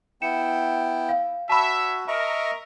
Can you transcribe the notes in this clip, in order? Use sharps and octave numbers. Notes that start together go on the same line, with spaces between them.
B3 E4 G5 C#7 E7
F5
F#4 C#5 E5 A5 B5
A#4 D#5 E5 C#6